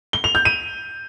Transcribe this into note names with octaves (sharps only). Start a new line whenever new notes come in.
G7
F7
G6
D#7